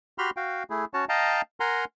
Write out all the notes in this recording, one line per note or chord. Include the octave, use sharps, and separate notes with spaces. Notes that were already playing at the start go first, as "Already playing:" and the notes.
F#4 G4 B5 C6 F6
F#4 F5 G5
A3 E4 G#4
C#4 F#4 C#5 A5
D#5 F5 G5 A5 A#5
A#4 F#5 G#5 A#5 C6